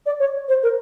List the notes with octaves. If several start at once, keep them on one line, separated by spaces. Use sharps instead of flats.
D5
C#5
C5
A#4